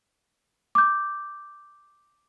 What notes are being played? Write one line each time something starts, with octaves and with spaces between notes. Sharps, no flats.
D6 G6